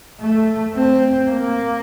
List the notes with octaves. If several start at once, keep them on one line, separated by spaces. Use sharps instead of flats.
A3
C4
A#3